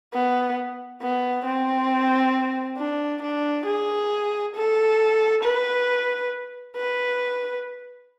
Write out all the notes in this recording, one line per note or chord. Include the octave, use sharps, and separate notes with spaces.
B3
B3
C4
D4
D4
G#4
A4
B4
B4